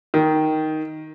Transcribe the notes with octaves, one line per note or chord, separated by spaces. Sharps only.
D#3